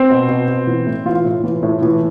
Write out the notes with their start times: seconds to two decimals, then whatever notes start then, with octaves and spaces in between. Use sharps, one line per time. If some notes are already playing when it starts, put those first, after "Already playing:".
Already playing: C4 C5
0.10 B2
0.28 B2
0.48 B2
0.67 E3
0.87 A2
1.06 E3 F4
1.24 A2
1.44 E3
1.63 A2
1.82 E3